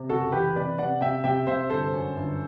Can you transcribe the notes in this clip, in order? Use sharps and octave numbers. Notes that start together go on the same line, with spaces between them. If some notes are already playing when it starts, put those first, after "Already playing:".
Already playing: C3
F#1 F#4 A4
E3 G4 B4
C3 B4 D5
C3 D5 F#5
C3 E5 G5
C3 E5 G5
C3 C5 E5
G1 A4 C5
F#2
G1